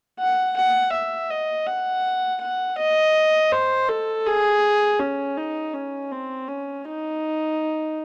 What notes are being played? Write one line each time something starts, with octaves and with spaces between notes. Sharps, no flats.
F#5
F#5
E5
D#5
F#5
F#5
D#5
C5
A4
G#4
C#4
D#4
C#4
C4
C#4
D#4